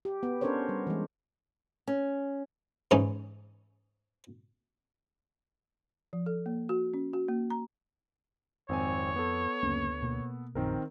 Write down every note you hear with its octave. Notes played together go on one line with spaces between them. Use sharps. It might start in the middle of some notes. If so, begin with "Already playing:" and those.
G4
B3
C#4 D4 A4 A#4 C5 C#5
G3
E3 G#3
C#4
G#2 E3 C#4 D#4
F3
A4
A#3
F#4
C#4
F#4
A#3
A#5
G#1 F2 C4 C#5 G#5
B3 A4
F#1 D2 A#3 C#4
B2 A#3
A#1 F#2 D#3 C4 A#4